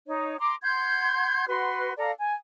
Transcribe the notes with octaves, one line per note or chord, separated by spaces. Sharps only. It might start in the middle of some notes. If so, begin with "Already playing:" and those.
D#4 C#5
A#5 C6 D6
F#5 C6 G6 G#6
F#4 B4 F#5 C6
A4 D5 F5 A#5
G#5